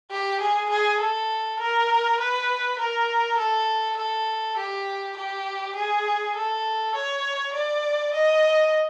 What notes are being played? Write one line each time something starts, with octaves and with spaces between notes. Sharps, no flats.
G4
G#4
G#4
A4
A#4
B4
A#4
A4
A4
G4
G4
G#4
A4
C#5
D5
D#5